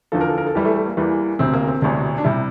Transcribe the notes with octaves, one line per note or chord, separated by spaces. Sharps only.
E2 D3 F3 A4
A#4
A4
A#4
A4
E2 E3 G3 G4
A3
A3
A#3
E2 E3 G3
E1 D2 C3 C4
A#3
C4
E1 D2 C3 D4
D4
C3 G3 E4